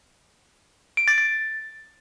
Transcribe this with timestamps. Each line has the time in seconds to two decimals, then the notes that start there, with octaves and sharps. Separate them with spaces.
0.97 D7
1.08 A6
1.18 A6